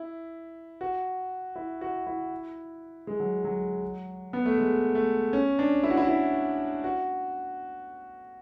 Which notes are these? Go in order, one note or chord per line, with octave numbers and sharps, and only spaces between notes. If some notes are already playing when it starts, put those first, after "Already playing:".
Already playing: E4
F#4
E4
F#4
E4
G#3
F#3
F#3
B3
A3
G#3
A3
C#4
D4
E4
F#4
E4
E4
F#4